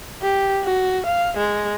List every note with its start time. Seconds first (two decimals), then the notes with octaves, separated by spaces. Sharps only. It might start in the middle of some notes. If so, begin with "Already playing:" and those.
0.22 G4
0.64 F#4
1.06 F5
1.37 G#3